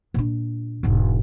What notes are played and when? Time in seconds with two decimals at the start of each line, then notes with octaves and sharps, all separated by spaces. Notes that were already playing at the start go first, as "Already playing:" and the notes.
0.14 A#2 D4
0.83 E1 G#2